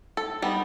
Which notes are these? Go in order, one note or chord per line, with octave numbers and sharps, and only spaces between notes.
A4
G3 B3 D#4